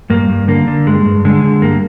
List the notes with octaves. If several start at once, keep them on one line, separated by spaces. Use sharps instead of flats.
G2 A#3
G2
D3 A#3
D3
G2 G#3
G2
D3 G#3
D3
G2 A#3